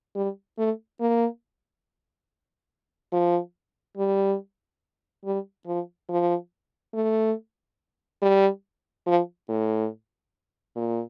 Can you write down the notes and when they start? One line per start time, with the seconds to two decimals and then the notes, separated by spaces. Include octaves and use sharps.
0.16 G3
0.58 A3
1.00 A#3
3.12 F3
3.97 G3
5.25 G3
5.67 F3
6.09 F3
6.94 A3
8.22 G3
9.07 F3
9.49 A2
10.76 A#2